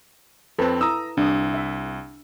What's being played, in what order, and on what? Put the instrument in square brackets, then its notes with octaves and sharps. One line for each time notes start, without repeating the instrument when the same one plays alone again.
[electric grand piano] F2 C4 [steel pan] A4 B4 A5
[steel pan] E4 [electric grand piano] A#5 D#6 E6
[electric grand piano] C2 [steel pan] D4 D#6
[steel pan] E5